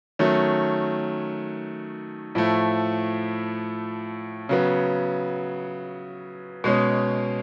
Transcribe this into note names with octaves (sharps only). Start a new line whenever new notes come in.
D#3 F#3 A3 C#4
A2 F3 A3
C#3 F#3 B3
B2 G#3 C#4